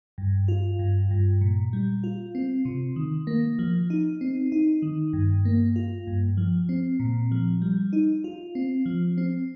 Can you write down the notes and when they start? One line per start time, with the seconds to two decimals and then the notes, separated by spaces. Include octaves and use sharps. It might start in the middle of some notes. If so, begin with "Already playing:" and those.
0.18 G2
0.48 F4
0.79 G2
1.11 G2
1.41 A#2
1.73 G3
2.04 F4
2.35 C4
2.65 C3
2.96 D#3
3.27 A#3
3.59 F3
3.90 D#4
4.21 C4
4.52 D#4
4.82 D#3
5.13 G2
5.45 A#3
5.76 F4
6.07 G2
6.37 F3
6.69 C4
7.00 A#2
7.32 F3
7.62 G3
7.93 D#4
8.24 F4
8.55 C4
8.86 F3
9.18 C4